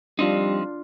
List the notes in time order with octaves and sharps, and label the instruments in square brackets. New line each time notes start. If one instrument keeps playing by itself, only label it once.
[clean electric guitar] F3 C4 D#4 [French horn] G3 [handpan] D4 F4